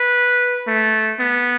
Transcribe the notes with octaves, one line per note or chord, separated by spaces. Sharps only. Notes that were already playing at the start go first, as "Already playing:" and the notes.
Already playing: B4
A3
B3